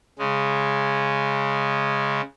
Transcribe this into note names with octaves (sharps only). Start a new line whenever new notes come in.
C#3 G#3